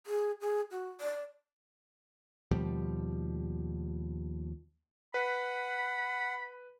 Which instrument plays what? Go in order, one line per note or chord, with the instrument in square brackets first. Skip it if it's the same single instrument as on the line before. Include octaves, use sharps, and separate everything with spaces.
[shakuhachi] G#4
G#4
F#4
D5
[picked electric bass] D#2 B2 F3 G3
[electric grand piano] B4 [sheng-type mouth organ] F#5 [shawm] B5